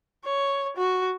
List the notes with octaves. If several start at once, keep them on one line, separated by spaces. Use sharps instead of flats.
C#5
F#4